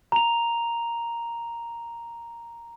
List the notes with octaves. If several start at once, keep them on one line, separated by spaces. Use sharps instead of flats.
A#5 F7